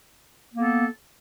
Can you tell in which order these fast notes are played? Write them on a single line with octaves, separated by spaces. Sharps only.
A#3 B3 A4